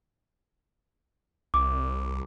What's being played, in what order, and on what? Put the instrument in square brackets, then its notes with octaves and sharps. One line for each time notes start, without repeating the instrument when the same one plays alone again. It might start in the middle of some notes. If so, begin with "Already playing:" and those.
[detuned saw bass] C2 [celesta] D6